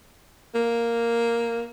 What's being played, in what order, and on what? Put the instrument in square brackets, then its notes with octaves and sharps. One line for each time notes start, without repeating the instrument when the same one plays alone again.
[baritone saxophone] A#3